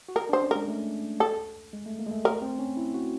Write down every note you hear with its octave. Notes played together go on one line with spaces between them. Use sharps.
F#4
F4 A#4
D4
C5
C#4
G#3 A#4
A3
A4
G#3
A3
A#3
G#3
A3
A3 A#4
C4
C#4
E4
F#4